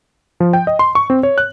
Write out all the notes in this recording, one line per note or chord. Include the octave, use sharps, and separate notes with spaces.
F3
G5
D#5
C6
C#6
C4
C#5
F#6